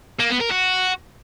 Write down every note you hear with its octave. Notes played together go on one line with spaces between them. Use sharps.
A#3
B3
A#4
F#4